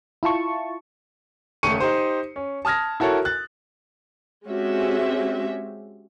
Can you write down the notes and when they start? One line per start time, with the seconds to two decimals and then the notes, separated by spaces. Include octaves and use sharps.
0.23 E4 F4 A5 C#6
1.63 D#1 C#3 A3 C#6 C#7 D#7
1.80 D#4 G4 C5
2.36 C#4
2.65 A5 D#6 F6 G#6 A#6
3.00 E4 F#4 A4 A#4 C#5
3.25 F#6 A6
4.47 G#3 C4 C#4 F#4 G4 E5